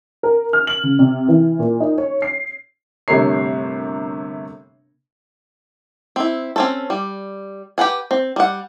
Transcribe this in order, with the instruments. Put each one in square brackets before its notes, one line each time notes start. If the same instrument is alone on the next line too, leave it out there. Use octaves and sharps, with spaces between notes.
[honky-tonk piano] A#4
F6
F#7
C#3
C3
E3
A#2
D#4
C#5
C7
[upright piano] G1 C3 A3 A#4 C#5 C7
[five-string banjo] C4 E4
C4 C#4 A4
G3
G4 B4 F#5 G#5
C4
G3 F#5